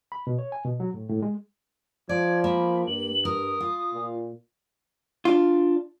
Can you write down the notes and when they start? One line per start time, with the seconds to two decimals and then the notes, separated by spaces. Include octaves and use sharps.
0.12 B5
0.27 B2
0.38 C#5
0.52 G#5
0.65 B2
0.80 F#3
0.94 A2
1.09 A2
1.22 G#3
2.09 F3 D5 G#6
2.44 A#3 B5
2.87 G2 F#7
3.25 A#4 D#6
3.60 F4
3.93 A#2
5.25 D4 F4